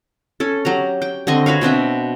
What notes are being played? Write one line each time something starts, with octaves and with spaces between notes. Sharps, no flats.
C#4 A4
F#3 G4 A#5
G5
D3 C4 D#5 C#6
F#4 B4 C#5 F5
B2 C4 D4 E5